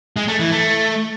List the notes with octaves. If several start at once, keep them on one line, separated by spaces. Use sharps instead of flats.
G#3
A3
E3
A3